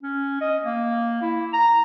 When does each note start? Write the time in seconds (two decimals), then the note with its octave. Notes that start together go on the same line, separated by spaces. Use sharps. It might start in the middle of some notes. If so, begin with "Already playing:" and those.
0.03 C#4
0.41 D#5
0.65 A#3
1.22 E4
1.53 A#5